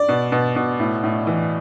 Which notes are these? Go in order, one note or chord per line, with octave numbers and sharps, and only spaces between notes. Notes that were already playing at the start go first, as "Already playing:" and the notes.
Already playing: D5
B2
B2
B2
A2
A2
E3